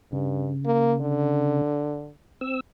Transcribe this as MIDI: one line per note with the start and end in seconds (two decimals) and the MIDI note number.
0.13 0.52 43
0.13 1.61 49
0.66 0.94 58
1.01 2.12 50
2.41 2.60 60
2.41 2.60 88